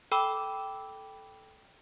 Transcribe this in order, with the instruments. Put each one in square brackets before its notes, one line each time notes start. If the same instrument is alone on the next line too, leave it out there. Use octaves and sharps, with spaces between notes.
[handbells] A4 G5 B5 D6 E6